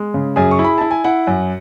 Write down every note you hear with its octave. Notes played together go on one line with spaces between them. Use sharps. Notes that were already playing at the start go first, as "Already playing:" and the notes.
Already playing: G#3
C#3
F#2 G#4 G#5
C#6
E4
B5
E4 A5
G#5
E4 F#5
F#2